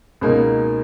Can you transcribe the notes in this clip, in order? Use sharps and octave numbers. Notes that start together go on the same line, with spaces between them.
C#2 B2 A#3 D#4